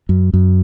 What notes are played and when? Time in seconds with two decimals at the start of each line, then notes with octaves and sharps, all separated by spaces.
0.09 F#2
0.34 F#2